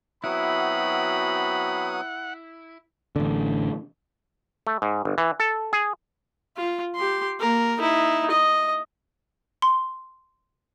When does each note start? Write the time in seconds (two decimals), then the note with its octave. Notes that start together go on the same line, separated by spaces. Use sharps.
0.24 F#3 B3 C4 E4 F#4 F#5 B5 D#6
3.16 A1 D3
4.67 A3
4.82 G#2
5.05 G1
5.18 E3
5.40 A4
5.73 G#4
6.57 F4
6.96 G4 C6
7.40 A#3 A#4
7.79 D#4 E4
8.31 D#5
9.62 C6